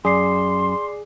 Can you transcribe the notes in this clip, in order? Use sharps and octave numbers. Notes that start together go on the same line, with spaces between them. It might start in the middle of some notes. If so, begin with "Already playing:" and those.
F#2 G#4 D5 C6 D6 C7